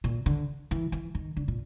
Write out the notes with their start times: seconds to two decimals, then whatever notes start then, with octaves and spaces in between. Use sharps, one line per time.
0.04 A#2
0.26 D3
0.71 E3
0.92 E3
1.15 D#3
1.37 D3
1.48 A#2